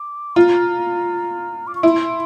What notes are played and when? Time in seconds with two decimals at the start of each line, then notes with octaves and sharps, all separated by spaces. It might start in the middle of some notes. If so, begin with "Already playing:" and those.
Already playing: D6
0.36 F4 A#5
1.67 D6
1.75 C#6
1.83 E4 C6